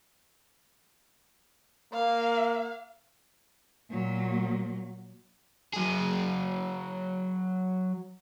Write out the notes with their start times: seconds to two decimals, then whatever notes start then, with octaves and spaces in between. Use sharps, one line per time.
1.93 A#3 F5
3.90 A#2 F#3
5.73 F#3 G#4